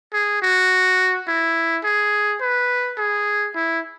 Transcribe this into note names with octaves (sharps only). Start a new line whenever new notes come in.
G#4
F#4
E4
G#4
B4
G#4
E4